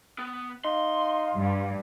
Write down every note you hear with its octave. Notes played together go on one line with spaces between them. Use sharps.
B3
D#4 F5 C6
G2